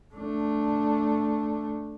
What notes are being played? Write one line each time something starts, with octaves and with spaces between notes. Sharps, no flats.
A3 D4